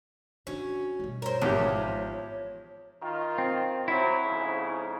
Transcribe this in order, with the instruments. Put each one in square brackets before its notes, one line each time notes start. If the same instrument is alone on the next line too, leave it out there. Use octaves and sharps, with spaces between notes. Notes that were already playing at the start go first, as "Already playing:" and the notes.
[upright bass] D3 [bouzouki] C#4 [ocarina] F#4
[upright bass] G2 B2
[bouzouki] A#4 C5 [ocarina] C#5
[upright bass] G#1 [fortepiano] E2 G4 [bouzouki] F3
[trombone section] D#3 F4
[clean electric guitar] C4
[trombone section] F#3 C5 [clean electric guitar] E4
[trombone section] F2 G#2 C#3